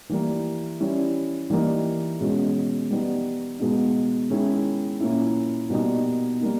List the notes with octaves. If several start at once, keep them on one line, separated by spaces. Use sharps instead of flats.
E3 G3 A#3
G3 C#4 E4
E3 G3 A#3 D#4
B2 G#3 C#4
G3 B3 D#4
B2 G#3 B3 D#4
D#3 G#3 C#4 E4
A#2 A#3 C#4 E4
B2 G3 A#3 D#4
G3 A#3 D#4